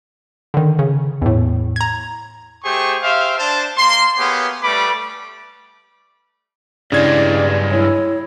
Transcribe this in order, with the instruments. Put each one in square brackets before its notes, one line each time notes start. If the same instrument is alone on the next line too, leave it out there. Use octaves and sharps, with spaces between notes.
[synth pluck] D3 D#3
C#3
E2 A2
A#5 G#6
[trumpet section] A3 G4 G#4 C5 C#6
G4 C5 E5 F5
D4 C5 A5
A#3 C6
A#3 B3 G4 G#4 C#5
G3 A3 B4 B5 D6
[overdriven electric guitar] G2 G#3 [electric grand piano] C#3 G#6 [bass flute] E4 [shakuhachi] D5
[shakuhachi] E4 [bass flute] C#5